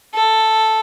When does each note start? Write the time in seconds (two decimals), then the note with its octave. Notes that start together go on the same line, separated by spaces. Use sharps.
0.14 A4